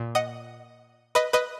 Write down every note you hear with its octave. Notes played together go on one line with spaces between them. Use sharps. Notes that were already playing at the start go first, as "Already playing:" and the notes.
Already playing: A#2
D#5 F#5
B4 D#5
B4 D#5